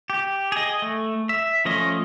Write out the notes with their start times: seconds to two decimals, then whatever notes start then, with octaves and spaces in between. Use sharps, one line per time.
0.10 G4
0.52 G#4 D#5
0.82 A3
1.29 E5
1.65 F3 A3 C#4 D#5